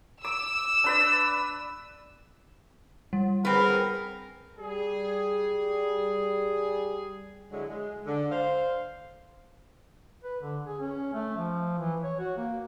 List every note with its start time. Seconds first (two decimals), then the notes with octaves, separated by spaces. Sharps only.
0.24 D6 E6
0.84 D4 B4 D5
3.13 G3
3.45 B3 C4 G#4 A#4
4.58 G3 G#4
7.52 D3 F#3 G#3 E4
7.69 G#3
8.06 D3
8.31 C5 F5
10.24 B4
10.41 D3
10.67 G#4
10.80 C#4
11.14 A3
11.36 F3
11.79 E3
12.03 C#5
12.19 F#4
12.37 A#3